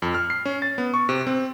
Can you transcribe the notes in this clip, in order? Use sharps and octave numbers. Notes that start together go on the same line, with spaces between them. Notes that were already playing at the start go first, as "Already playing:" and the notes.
F2
F6
C7
C#4
A6
B3
C#6
C3
C4